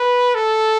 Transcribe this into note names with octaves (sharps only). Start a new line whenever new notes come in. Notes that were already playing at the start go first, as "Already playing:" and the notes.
Already playing: B4
A4